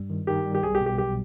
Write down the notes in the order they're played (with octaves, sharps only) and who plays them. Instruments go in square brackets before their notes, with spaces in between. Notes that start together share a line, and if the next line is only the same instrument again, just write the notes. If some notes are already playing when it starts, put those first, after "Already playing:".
Already playing: [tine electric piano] G2 G3
D#3
[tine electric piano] D#3 [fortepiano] G4
[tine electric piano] G3
[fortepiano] G4
[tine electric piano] B1 [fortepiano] G#4
[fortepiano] G4
[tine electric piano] B2
[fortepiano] G4
[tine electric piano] B1 [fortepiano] G4